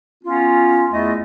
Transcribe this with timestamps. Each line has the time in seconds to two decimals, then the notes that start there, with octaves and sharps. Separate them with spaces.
0.24 B3 C#4 F4
0.92 E2 A3 E4 D#5